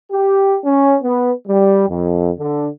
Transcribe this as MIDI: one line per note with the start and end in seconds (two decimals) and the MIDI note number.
0.12 0.57 67
0.65 0.96 61
1.03 1.31 59
1.48 1.88 55
1.89 2.30 41
2.39 2.68 50